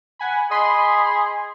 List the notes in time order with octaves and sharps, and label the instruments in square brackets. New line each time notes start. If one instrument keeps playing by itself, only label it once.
[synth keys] F#5 G#5 B5
[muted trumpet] G#4 [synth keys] D#5 B5 C6